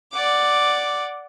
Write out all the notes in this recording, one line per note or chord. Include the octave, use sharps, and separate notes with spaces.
D5 F#5 D6